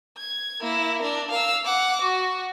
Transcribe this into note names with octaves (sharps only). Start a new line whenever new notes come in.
G#6
A#3 E4
D4 A#4
F5 E6
F#5 D6
F#4